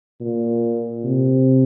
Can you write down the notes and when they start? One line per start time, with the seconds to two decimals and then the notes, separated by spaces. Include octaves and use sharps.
0.21 A#2
1.04 C3